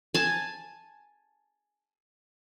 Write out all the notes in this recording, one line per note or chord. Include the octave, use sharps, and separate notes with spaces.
G#5 A5